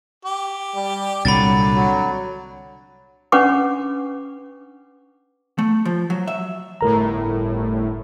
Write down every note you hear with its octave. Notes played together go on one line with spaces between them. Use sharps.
G4
G3
C2 A#2 D3 F#3 B5 A6
F#3
C#4 D4 B4 F#5 C#6 D6
A3
F3
F#3
E5
G1 A2 A#4 A#5